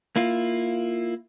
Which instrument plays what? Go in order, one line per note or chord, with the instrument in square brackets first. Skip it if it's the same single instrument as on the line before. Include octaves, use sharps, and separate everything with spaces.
[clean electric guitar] A#3 E4 F4